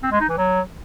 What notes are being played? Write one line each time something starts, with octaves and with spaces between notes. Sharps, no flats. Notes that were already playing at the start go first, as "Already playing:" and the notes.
C4
G#3
D#4
E3
F#3